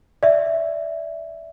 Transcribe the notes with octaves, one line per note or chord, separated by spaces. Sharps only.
D5 E5